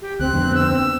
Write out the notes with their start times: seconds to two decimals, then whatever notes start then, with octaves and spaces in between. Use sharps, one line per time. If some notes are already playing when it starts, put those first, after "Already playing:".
0.02 G4
0.19 D2 C4 F#6
0.33 F2 D3 B3
0.55 E6